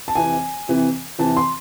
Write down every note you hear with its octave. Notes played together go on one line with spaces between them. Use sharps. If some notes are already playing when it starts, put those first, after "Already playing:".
A5
F2 C3 E3 G#5
F2 C3 E3
F2 C3 E3 A5
C6